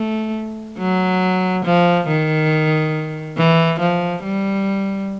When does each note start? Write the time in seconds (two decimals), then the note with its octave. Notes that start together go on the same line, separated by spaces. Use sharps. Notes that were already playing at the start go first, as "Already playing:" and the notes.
Already playing: A3
0.78 F#3
1.65 F3
2.08 D#3
3.37 E3
3.80 F3
4.23 G3